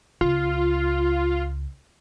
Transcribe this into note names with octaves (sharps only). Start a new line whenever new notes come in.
C#2 F4